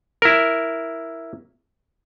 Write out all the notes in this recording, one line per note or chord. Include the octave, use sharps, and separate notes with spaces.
E4 A#4